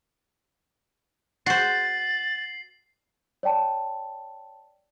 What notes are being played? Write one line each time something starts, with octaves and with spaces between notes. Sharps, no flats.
F#4 C5 A6 C7 F#7
C#5 D5 G5 A5